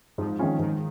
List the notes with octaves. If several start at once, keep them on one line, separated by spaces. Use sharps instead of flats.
G#2 F3
D#3 G#3 C#4 F4
G#2 D#3